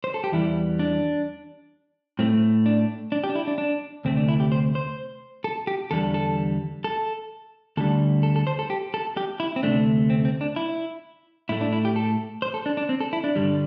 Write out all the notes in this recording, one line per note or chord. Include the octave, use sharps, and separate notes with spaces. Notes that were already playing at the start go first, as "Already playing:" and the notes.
C5
A4
G4
E2 E3 G3 E4
D4
A2 A3 C4
D4
D4
G4
D4
E4
D4
D4
D2 C3 A3 C4
D4
E4
G4
C5
C5
A4
G4
E2 D3 G3 A4
A4
A4
D2 D3 G3 A4
A4
A4
C5
A4
G4
A4
G4
E4
C4
D2 C3 A3 D4
C4
C4
D4
E4
A2 A3 E4
D4
E4
G4
A4
C5
A4
D4
D4
C4
A4
E4
D4
G2 D3 G3